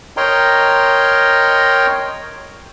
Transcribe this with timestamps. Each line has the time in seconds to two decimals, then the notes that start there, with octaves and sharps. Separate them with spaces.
0.17 A#4 C#5 D#5 G5 A#5 C6